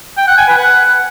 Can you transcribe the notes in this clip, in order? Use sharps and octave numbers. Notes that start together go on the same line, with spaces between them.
G5
F#5
G#5
B4
F#5